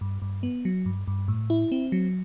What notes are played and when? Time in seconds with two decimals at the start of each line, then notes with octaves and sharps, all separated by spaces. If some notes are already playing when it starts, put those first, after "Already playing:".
0.01 G2
0.22 G2
0.43 B3
0.65 F#3
0.86 G2
1.08 G2
1.28 A2
1.50 E4
1.72 C4
1.92 F#3